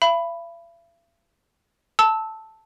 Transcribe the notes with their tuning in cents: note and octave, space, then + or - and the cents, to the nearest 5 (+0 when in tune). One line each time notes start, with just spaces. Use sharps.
E5 +45 B5 +0
A5 +0 E6 -20